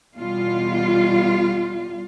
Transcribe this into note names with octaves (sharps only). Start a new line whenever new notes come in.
E2 B2 G3 F4